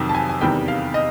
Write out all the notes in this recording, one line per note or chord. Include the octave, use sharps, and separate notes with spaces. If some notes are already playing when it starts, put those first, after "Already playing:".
Already playing: F2 C3 D#3 F#3 G5
A5
G#5
G#5
E2 C3 D#3 G3 G5
F5
D#5